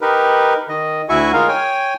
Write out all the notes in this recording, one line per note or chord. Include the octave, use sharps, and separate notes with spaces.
D#4 G4 A#4 B4
D#3 D#5
D2 E4 F#4 E5 G#5 C#6
G#3 D#4 F4 A#4 F5
C#5 G5 G#5